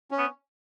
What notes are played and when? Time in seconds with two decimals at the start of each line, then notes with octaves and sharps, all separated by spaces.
0.11 C#4
0.18 B3